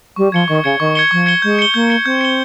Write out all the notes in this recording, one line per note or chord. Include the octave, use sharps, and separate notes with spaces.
G3 C#6
F3 G#6 C#7 G7
D#3 C#6
C#3 G#6 C#7 G7
D#3 C#6
G#6 C#7 G7
F3 C#6
G#6 C#7 G7
G#3 G6
C#7 G7
A#3 G6
C#7 G7
C4 G6
C#7 G7